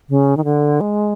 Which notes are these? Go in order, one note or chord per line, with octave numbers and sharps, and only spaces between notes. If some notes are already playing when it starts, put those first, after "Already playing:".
C#3
D#3
D3
G#3